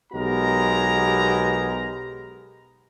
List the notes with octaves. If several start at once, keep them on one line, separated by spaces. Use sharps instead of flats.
B1 G#3 B3 G4 A#4 A#5